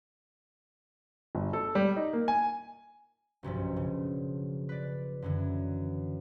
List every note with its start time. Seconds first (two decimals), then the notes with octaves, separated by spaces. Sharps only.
1.35 G1
1.53 A4
1.75 G3
1.96 D#4
2.13 A#3
2.28 G#5
3.43 F#1 B1 G2 F3
3.76 C#3
4.69 B4 D5
5.22 F#2 D3 E3